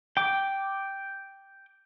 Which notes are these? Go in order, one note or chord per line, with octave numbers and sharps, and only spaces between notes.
G5 D6